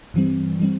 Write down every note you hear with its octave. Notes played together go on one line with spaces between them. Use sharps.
G2 E3 G3 C4
E3 G3 C4